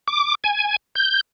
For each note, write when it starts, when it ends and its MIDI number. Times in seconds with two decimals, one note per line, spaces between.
0.08 0.35 86
0.44 0.76 80
0.95 1.21 91